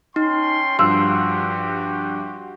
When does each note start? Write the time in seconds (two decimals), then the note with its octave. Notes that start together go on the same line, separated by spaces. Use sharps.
0.16 C#4 D#4 G5 C6
0.79 G2 F3 F#4 G4 C6 E6